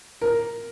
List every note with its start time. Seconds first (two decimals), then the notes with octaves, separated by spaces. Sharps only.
0.21 A#4